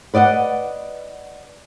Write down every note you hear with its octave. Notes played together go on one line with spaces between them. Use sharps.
B4 D5 D#5 F5 F#5